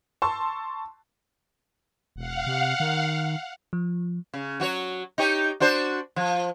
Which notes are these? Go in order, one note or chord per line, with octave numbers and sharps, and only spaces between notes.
A5 C6 C#6 E6
E1 F5 F#5
C3
D#3
F3
C#3
F#3 F#4 C#5
D#4 G4 C#5
D4 F#4 C5
F3